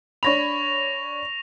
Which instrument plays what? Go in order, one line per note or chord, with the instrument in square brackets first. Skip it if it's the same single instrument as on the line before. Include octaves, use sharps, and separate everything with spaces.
[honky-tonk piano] D4 C#5 B5 [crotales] C#6 A#6 F7